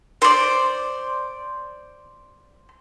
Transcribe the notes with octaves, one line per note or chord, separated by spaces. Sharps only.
C5 D5